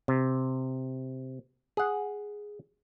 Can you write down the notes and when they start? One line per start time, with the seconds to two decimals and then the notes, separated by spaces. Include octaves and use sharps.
0.08 C3
1.77 G#4 F#5